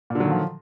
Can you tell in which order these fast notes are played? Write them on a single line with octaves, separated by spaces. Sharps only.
A#2 D3 F#3 D#3 F3